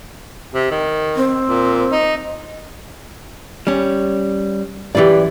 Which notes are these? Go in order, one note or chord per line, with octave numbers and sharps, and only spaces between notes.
C3
D#3
C4
A#2
D#4
G3 C#4
F#2 E3 G4 B4 D5